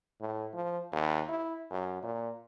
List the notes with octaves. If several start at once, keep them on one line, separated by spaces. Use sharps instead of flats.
A2
F3
D#2
E4
F#2
A#2